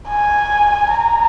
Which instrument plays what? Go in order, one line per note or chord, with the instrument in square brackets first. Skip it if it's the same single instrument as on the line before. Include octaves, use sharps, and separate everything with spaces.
[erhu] G#5
A#5